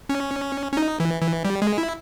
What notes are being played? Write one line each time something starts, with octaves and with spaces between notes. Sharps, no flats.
C#4
C#4
D#4
E3
E3
G3
G#3
E4